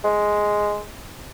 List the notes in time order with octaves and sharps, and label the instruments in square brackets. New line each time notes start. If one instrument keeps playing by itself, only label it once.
[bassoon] G#3